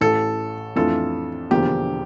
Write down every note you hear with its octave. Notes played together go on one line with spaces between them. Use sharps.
A1 A2 E3 A4
F2 E3 A3 D4 F4 A4
E1 E2 D3 F3 A#3 G4